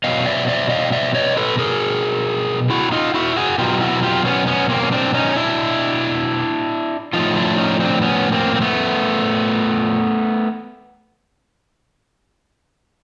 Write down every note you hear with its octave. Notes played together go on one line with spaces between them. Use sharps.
B2 F#3 D#5 F5
D5 E5
D5 E5
D#5 F5
D5 E5
C#5 D#5
A4 B4
G#4 A#4
E4 F#4
D#4 F4
E4 F#4
F#4 G#4
B2 F#3 F4 G4
E4 F#4
F4 G4
B3 C#4
B3 C#4
A#3 C4
C#4
C4 D4
C#4 D#4
D4 E4
A2 F3 D#4 F4
D4 E4
C#4 D#4
C4 D4
B3 C#4
A#3 C4
C4
A3 B3